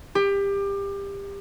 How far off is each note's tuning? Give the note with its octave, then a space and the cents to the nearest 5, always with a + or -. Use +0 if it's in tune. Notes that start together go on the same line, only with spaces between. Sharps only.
G4 +25